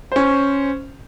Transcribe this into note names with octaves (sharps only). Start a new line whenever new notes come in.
C#4 C5